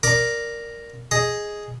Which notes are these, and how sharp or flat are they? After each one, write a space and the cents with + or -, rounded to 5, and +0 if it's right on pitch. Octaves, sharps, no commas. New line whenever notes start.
A#4 +0 D5 +0 D6 +0
G#4 +0 D#5 +5